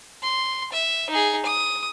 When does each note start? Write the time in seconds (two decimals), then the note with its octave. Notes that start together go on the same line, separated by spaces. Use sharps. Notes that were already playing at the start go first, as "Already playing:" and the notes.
0.22 C6
0.73 E5
1.10 D#4 G#4
1.46 D#6